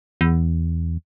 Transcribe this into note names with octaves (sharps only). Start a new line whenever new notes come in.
E2